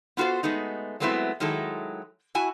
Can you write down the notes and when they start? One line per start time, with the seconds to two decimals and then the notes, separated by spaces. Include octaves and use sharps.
0.17 B3 F4 F#4 A4 C5
0.43 G#3 A3 B3 D#4
1.00 F#3 G#3 A3 B3 C4 E4
1.40 D#3 F#3 G#3 E4 A4
2.35 E4 F#4 G#5